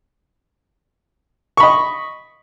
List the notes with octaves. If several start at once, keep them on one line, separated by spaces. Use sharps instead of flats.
D#5 B5 C#6